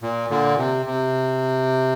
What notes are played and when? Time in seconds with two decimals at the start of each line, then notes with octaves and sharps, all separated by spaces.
0.02 A#2
0.30 A#2 D3
0.57 C3
0.86 C3